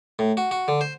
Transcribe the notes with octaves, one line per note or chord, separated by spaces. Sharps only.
A2
F#4
F#4
D3
C5